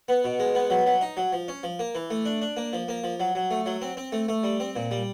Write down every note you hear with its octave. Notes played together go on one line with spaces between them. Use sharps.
B3
B2
G#3
B3
F#3
F#3
D#4
F#3
F3
C#4
F3
A#3
E3
A3
D4
D4
A#3
F3
A#3
F3
F#3
F#3
A3
F#3
C4
C4
A3
A3
G3
C4
A#2
G3